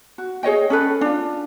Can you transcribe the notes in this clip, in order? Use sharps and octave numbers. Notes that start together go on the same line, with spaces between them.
F#4
G#4 C#5 D#5 G5
C#4 A4 B4
D4 F4